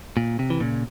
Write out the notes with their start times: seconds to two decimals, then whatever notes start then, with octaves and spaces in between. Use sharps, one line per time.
0.17 A#2
0.39 C3
0.50 E3
0.60 A#2 C#3